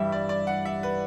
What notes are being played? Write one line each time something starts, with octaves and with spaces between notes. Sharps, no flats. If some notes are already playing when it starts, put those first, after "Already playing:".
Already playing: G2 E3 G3 E5
D5
D5
F#5
E5
B4